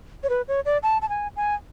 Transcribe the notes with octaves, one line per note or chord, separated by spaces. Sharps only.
C#5
B4
C#5
D5
A5
A5
G#5
G#5